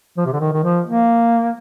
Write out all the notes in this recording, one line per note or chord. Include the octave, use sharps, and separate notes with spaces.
F3
C3
D3
D#3
D#3
F3
A#3